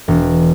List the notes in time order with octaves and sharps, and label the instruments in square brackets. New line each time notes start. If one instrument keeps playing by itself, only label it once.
[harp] E1